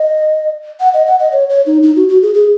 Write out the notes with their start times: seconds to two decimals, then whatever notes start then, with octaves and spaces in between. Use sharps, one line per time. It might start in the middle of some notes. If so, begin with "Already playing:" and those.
Already playing: D#5
0.80 F#5
0.94 D#5
1.07 F#5
1.20 D#5
1.32 C#5
1.49 C#5
1.66 D#4
1.83 D#4
1.96 F#4
2.09 F#4
2.22 G#4
2.34 G#4